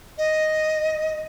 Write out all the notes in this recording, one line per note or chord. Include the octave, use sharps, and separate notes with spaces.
D#5